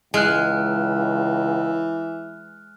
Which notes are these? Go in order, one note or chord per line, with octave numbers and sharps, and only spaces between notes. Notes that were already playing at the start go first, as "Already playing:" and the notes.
C#2 E3 G#3 G#5 F6 F#6